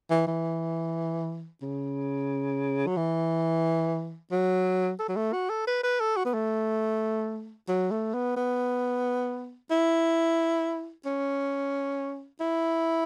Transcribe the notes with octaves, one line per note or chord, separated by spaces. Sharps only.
E3
E3
C#3
F#3
E3
F#3
A4
F#3
A3
F#4
A4
B4
B4
A4
F#4
B3
A3
F#3
A3
B3
B3
E4
C#4
E4